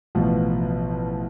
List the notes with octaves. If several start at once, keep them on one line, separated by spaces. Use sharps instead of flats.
A1 B2 F3